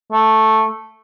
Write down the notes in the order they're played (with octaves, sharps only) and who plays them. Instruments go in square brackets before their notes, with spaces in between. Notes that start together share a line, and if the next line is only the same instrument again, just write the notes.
[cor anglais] A3